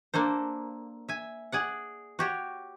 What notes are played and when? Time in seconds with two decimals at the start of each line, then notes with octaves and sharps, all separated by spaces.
0.14 A#3 D4 A4 C5
1.09 E5 G#5
1.52 G#4 D5 F#5
2.19 F#4 G4 C#5